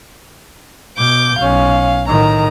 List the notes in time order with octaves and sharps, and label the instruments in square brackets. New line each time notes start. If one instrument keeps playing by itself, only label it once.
[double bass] B2 [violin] D6 G6
[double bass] B1 C#4 [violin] F5
[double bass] A2 D#3 [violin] A#5